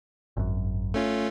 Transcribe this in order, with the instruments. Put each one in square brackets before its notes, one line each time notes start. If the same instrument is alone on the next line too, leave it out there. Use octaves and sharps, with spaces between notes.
[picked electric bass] G#1 F#2
[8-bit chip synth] A3 C#4 F4